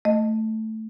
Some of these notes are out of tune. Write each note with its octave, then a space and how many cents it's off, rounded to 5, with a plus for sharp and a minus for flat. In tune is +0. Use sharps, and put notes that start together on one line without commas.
A3 +0 D#5 +0